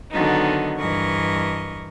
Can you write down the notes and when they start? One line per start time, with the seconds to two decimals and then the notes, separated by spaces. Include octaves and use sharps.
0.12 D3 D#3 F#3 B3 D#4
0.78 G2 E3 A#4 D#5 C#6